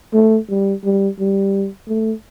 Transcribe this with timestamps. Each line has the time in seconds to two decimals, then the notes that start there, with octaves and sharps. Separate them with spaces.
0.14 A3
0.50 G3
0.84 G3
1.19 G3
1.88 A3